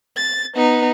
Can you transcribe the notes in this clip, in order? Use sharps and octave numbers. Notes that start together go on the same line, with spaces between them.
A6
B3 D#4